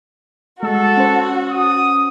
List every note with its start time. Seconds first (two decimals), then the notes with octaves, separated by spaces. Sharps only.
0.63 G#3 F#4 A4 E6
0.97 C#4 C5
1.51 D#6